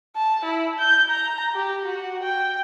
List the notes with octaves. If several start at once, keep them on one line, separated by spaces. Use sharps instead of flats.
A5
E4
G6
A#5
G4
F#4
G5